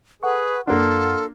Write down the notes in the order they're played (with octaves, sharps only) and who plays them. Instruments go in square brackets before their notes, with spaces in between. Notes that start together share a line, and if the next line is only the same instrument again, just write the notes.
[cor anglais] G#4 [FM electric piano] A4 F#5 C#6 [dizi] B4
[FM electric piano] F#2 F#5 [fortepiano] A#3 D4 [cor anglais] F4 [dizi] A4